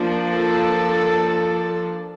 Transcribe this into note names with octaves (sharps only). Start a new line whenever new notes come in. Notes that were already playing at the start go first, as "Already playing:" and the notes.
Already playing: F3 A#3 D4
A4